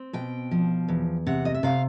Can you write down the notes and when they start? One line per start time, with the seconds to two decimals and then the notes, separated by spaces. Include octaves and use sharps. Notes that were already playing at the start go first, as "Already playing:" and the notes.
Already playing: C4
0.13 B2 G5
0.51 F3
0.88 E2
1.27 C3 F#5
1.45 D#5
1.55 E5
1.63 C3 F5